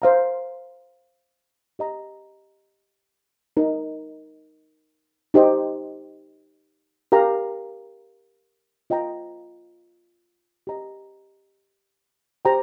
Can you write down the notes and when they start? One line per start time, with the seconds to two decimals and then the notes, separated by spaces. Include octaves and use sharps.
0.02 C5 F5 A#5
1.79 G4 D#5 A#5
3.57 D#4 A#4 D#5
5.34 D#4 G4 C5 D#5 G5
7.12 G4 A#4 F5 A#5
8.90 F4 D#5 G5 A#5
10.67 G4 D#5 A#5
12.45 G4 C5 G5 A#5